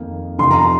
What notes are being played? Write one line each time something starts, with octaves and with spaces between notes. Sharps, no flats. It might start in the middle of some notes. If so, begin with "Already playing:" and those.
Already playing: F2 D#3 A#3 D#4
F1 F2 C3 F3 C6
A#5
C6